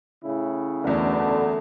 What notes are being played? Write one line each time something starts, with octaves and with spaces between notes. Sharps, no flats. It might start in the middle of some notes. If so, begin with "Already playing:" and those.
A2 C#3 E4
F#1 E2 B2 D3 A3